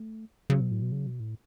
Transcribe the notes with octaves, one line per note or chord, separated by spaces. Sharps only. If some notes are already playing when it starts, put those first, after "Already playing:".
Already playing: A3
C#3 F#3
B2
A2
B2
C#3
B2
A2